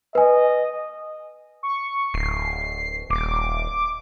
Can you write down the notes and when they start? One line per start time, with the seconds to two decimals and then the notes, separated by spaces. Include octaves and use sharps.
0.15 B4 D#5 G#5
1.63 C#6
2.14 D1 C7
3.10 D#1 D6